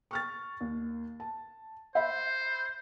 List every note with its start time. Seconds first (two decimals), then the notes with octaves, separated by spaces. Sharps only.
0.11 C#6 F6 A6
0.61 D#2
1.20 A5
1.95 C5 E5 B5